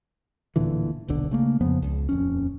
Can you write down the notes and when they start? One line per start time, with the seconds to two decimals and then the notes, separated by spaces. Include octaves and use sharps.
0.56 D1 A#2 D3 E3
1.08 D#1 B1 D3
1.31 C#3 A3 A#3
1.60 F2 C#3 F3 B3
1.82 C#2
2.09 D#1 F2 C#4